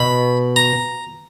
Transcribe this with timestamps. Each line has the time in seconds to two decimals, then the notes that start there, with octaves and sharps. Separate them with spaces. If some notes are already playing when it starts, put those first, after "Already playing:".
Already playing: B2 B5
0.56 A#5